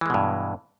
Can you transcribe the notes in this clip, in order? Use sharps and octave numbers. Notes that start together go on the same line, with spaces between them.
G2 B2 E3 G#3